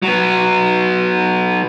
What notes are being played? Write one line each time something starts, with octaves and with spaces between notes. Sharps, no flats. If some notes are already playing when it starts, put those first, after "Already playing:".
F#3 B3